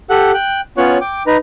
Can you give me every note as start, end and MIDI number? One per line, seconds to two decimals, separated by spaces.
0.10 0.32 67
0.10 0.32 69
0.10 0.32 78
0.10 0.32 90
0.34 0.61 79
0.34 0.61 90
0.78 0.98 59
0.78 0.98 61
0.78 0.98 65
0.78 0.98 73
0.78 0.98 85
0.78 0.98 90
1.01 1.23 79
1.01 1.23 86
1.27 1.37 63
1.27 1.37 71
1.27 1.37 82